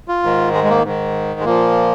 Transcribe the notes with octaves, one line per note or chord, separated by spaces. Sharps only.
F4
G#2 D#3
G#3
G#3
A#3
G#2 D#3
G#3
A#2 F3 A#3